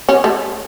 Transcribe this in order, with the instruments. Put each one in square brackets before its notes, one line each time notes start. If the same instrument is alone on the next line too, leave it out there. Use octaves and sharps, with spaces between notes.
[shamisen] C#4
A3